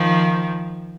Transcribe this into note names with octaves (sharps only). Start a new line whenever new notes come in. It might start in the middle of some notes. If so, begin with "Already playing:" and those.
Already playing: D#3 F3